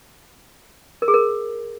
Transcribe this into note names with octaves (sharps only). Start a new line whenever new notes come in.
A#4
G#4
A#4